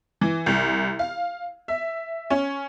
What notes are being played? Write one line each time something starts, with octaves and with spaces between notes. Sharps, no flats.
E3
C2
F5
E5
C#4